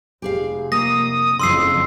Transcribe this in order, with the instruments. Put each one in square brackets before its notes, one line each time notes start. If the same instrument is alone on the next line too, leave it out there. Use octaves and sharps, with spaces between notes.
[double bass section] F1 [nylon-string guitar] G4 G#4 F5
[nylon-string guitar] A#3 [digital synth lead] D#6 [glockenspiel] A#6
[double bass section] F#1 F2 [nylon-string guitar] D3 F3 [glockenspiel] C6 E6 C7